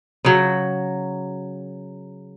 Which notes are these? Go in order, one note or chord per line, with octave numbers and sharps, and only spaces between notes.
C#3 F#3